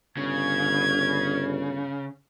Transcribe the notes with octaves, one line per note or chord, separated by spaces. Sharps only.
G1 C#3 G#6